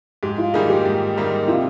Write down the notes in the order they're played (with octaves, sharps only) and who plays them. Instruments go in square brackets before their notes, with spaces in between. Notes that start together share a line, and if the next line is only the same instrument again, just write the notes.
[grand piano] G#2 [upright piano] G4
[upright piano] F4
[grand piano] D#3 G3 A#3 D#4 [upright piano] G#4
[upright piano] G4
[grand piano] G#2
D#3 G3 A#3 D#4
[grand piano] C3 [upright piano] F4